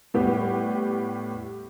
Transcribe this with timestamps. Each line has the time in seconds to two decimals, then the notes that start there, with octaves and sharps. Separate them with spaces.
0.14 A2 G3 B3 G4